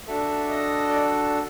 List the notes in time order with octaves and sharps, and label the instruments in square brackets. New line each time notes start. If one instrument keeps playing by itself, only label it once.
[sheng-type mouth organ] D4 F#4 A4 E5
D5
D#5
D5